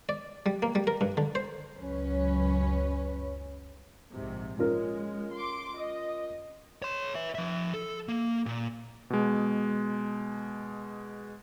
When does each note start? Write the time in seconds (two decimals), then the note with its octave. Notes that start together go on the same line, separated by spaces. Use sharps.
0.09 D5
0.46 G3
0.62 A#3
0.75 G3
0.87 A#4
1.01 G2
1.17 D3
1.35 C5
1.79 C#2 F#2 C#4 B4
4.12 A#1 G#2 C3
4.59 G#3 C#4 F4 A#4
5.34 C6 D6
5.76 D#5
6.82 C#5 C6
7.15 B4 E5
7.35 F3 E5
7.73 A4
8.08 A#3
8.46 A#2
9.10 B2 G#3